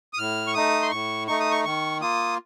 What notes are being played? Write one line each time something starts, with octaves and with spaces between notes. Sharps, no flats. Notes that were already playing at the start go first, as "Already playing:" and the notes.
D#6
A2 F6
C#6
A3 D#4 D#6
C6
A2 C#6
A3 D#4 C#6
D#6
C#6
D#3 C#6
A#3 F4 D#6